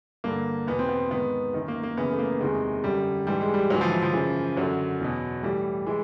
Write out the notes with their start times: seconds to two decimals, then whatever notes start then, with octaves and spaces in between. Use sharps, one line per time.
0.24 G2 D3 A#3
0.67 E2 B2 B3
0.79 C4
0.89 B3
1.10 G#2 D#3 B3
1.54 F#2 D#3
1.68 A#3
1.83 A#3
1.97 F#2 C#3 E3 B3
2.12 A3
2.19 A#3
2.40 E2 C3 D#3 G#3
2.84 F#2 D3 G3
3.27 G#2 E3 G3
3.41 G#3
3.54 G3
3.70 G#2 E3 F#3
3.81 F3
3.92 E3
4.02 F3
4.13 F#2 C#3 E3
4.56 F#2 D3 F#3
5.00 E2 B2
5.43 A2 E3 G3
5.86 E3 G#3